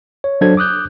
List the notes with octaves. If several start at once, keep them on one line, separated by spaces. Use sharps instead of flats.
C#5
F#3 D4 A4 C5 G#6
D6 D#6 F#6 G6